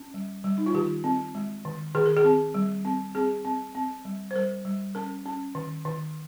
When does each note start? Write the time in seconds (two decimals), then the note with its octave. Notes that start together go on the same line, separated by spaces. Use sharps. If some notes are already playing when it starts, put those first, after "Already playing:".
Already playing: C#4
0.14 G3
0.44 G3
0.58 D#4
0.66 F4
0.74 D#3 G4
1.04 C4
1.35 G#3
1.65 D#3
1.95 D#3 G#4
2.06 A#4
2.17 G#4
2.24 C4
2.54 G3
2.85 C4
3.15 C4 G#4
3.45 C4
3.75 C4
4.05 G3
4.31 C5
4.35 G3 A#4
4.65 G3
4.95 C#4 A#4
5.26 C#4
5.55 D#3
5.85 D#3